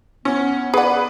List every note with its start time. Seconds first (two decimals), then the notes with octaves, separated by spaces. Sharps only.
0.25 B3 C#4
0.74 G#4 B4 D5 F#5